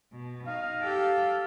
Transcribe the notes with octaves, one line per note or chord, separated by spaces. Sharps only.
B2
D#4 F5
G4 A4